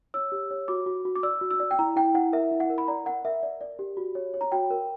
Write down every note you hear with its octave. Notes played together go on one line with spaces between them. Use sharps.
C#5 E6
G4
C#5
F#4 D6
F#4
F#4
D6
D5 E6
F#4
E6
D5
G5
E4 A#5
E4 G5
E4 F#5
A#4 E5
E4
F#5
A#4
B5
D5 A#5
A#4 F#5
A#4 E5
D5
D5
G4
F#4
C#5
C#5
A#5
F#4 G5
A#4